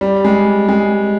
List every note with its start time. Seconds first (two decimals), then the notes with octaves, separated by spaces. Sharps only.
0.01 G3
0.25 G#3
0.69 G#3